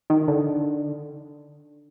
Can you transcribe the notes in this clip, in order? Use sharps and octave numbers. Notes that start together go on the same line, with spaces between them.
D#3
D3